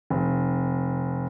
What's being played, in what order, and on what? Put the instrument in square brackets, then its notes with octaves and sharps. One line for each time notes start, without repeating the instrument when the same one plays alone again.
[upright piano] F1